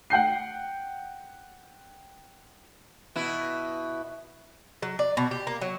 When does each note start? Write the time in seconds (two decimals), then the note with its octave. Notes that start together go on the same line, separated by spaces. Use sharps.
0.10 F#5 G5 G6 C7
3.16 B2 E4
4.82 F#3
4.99 D5
5.17 B2
5.31 G4
5.47 A#3
5.61 F#3